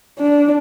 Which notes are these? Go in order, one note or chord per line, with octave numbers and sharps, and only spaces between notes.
D4